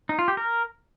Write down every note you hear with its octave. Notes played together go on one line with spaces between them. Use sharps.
D#4
F4
G4
A#4